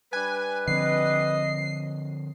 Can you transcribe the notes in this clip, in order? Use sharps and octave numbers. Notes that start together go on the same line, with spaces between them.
G3 D4 B4 G#5
D3 F3 C4 D#5 C7